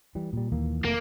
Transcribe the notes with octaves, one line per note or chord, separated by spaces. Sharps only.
E3 G3
A#2 G3
D#2 E3 A#3
F1 A3 A#3